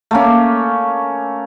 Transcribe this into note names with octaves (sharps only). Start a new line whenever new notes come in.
A3 A#3 C#4